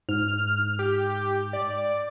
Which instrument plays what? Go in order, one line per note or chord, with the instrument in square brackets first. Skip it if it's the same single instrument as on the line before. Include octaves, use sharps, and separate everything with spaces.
[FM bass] G#2 [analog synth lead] F6
[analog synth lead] G4
D5